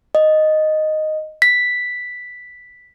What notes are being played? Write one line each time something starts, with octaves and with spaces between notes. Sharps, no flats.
D#5
B6